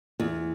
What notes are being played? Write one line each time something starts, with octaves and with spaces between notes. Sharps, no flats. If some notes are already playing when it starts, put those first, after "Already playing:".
E2